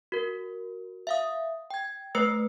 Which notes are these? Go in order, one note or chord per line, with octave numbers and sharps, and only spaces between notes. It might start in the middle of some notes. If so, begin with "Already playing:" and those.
F#4 A#4
E5 F5 D#6
G5 G#6
A3 B4 C5 E6 C#7